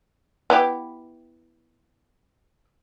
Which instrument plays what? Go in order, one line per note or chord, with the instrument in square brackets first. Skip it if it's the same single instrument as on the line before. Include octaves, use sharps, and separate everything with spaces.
[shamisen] B3 E4 G4